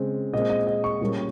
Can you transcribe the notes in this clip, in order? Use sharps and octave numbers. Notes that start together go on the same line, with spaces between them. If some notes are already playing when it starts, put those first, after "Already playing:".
Already playing: C#3 G#3 C4
A#2 G#3 C4 D#5
D#5
D#5
C#6
A#2 G3 A#3 C#4